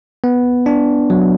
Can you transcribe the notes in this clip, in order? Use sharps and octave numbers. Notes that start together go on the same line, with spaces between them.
B3
D4
F#3